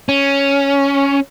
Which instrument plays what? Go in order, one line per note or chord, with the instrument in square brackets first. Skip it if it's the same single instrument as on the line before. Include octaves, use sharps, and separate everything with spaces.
[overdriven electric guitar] C#4